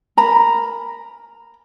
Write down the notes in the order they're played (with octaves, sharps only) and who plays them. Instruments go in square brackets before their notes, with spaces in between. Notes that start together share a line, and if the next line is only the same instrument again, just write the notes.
[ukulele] A#4 A#5 B5